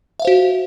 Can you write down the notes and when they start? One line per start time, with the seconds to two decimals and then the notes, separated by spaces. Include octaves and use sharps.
0.20 E5
0.22 F5
0.25 C5
0.27 F#4